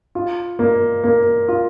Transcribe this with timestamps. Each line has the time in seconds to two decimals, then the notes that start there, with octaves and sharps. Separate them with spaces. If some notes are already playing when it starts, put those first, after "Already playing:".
0.15 F4
0.59 A#3
1.04 A#3
1.48 F4